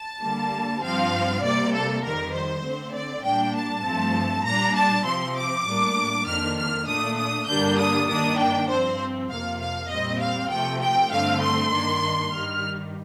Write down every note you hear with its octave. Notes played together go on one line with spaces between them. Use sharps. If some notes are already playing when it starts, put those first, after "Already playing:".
Already playing: A5
D3 G3 A#3
G2 F3 C4 F5
C3 G3 A#3 D5
A4
F2 D#3 G3 A#4
C5
D3 A3 C4
D5
A#2 G3 A#3 D4 G5
A5
G2 F3 A3 C4
A#2 G3 D4 A#5
A5
C3 F3 C4 C6
D6
A2 G3 A#3 D4
F2 D#3 A#3 D4 F6
F6
A#2 A3 D4 D#6
D#6
G2 D3 G3 A#3 D4 G6
D#6
G2 D#3 A#3 D4 D#6
G5
G2 F3 C4 C5
F2 C3 F3 A#3 F5
F5
A#2 G3 C4 D#5
F5
C3 F3 A3 G5
G5
G2 D3 A3 C4 F5
C6
G2 D#3 A#3 D4
G2 D#3 G3 F6